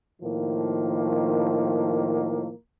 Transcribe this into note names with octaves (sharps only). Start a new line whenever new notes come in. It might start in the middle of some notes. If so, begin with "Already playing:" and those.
A2 D#3 F3 A#3